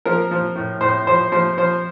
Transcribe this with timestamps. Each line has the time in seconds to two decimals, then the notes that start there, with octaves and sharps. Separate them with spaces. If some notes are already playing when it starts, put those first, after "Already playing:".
0.05 F3 A#4
0.31 F3
0.55 A2
0.81 A2 C5
1.07 F3 C5
1.32 F3 C5
1.58 F3 C5